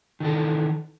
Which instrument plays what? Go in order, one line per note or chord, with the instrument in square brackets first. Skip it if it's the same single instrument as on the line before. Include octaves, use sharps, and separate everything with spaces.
[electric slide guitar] D#3 E3 A4